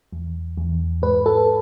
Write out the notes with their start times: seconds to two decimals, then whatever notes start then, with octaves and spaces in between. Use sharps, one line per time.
0.12 E2
0.57 E2
1.02 G#2 B4
1.26 A4